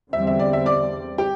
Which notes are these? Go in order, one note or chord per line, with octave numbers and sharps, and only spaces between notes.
E2 D3 G3 C4 E5
E5
D5
E5
D5 D6
G4 G5